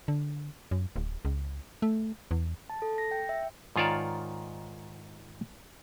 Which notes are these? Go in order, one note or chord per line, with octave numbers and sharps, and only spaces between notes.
D3
F#2
D1
C#2
A3
E2
A5
A4
A#6
G5
E5
G#2 D#3 F4 C#5 D5 A5